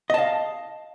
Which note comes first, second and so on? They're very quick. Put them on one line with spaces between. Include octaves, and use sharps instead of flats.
D#5 A5 F5